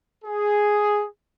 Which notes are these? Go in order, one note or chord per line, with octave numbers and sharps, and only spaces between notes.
G#4